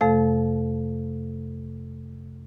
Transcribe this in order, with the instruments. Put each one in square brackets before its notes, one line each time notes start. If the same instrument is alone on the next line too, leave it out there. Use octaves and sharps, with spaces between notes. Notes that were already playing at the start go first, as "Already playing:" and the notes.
[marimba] F2 C3 A3 A4 F5